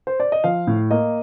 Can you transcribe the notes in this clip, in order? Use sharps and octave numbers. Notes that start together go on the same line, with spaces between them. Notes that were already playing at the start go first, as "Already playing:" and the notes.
C5
D5
D#5
F3 F5
A2
A#3 D#5